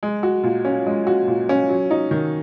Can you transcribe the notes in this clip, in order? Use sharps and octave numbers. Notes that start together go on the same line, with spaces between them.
G#3
F#4
A#2
C#4
G#3
F#4
A#2
C#4
F#3
D#4
D#3